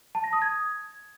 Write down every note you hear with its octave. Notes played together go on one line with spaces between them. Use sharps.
A5
A#6
D#6
G#6